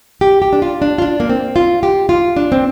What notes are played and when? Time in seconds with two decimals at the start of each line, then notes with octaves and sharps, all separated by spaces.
0.21 G4
0.42 G4
0.53 D4
0.62 F4
0.82 D4
0.98 F4
1.02 D4
1.20 A#3
1.29 C4
1.56 F4
1.83 G4
2.09 F4
2.37 D4
2.52 C4